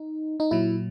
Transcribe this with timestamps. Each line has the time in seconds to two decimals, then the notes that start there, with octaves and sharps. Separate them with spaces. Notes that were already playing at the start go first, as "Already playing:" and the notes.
Already playing: D#4
0.40 D#4
0.51 A#2 F#3 E4